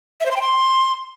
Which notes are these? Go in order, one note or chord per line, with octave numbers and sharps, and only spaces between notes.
E5
C5
C6
G5
C6